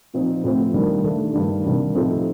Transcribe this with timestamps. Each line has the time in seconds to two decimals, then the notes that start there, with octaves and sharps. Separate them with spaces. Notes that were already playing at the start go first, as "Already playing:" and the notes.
0.14 A#2 F3 C4 D#4
0.44 A2 F3 C4
0.74 D#3 G3 A#3 D4
1.04 D#3 A3 D4
1.34 G2 D#3 G3 A#3 D4
1.64 C3 D#3 G3 A#3 D4
1.94 A2 F3 A3 C4 D#4